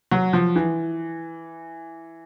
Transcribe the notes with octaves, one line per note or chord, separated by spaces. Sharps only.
F#3
F3
E3